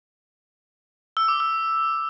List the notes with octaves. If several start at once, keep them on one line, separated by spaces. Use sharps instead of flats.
E6
D6
E6